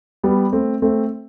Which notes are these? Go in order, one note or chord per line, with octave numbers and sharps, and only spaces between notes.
G3 B3
A3 C4
A3 C4